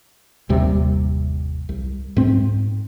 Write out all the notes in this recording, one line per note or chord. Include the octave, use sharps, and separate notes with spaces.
G1 D#2 C3 G3
C2
G#2 C4